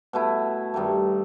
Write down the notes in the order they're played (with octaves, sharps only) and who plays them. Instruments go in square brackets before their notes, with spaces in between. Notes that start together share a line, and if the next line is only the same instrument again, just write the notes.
[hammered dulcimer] B2 A3 E4
G2 D#3 A3